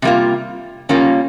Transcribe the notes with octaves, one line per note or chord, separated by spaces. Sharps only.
C3 G3 A#3 F4
C#3 G3 A#3 C#4 F4